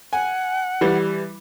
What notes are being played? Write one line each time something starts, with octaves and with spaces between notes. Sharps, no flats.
F#5 G#5
E3 G3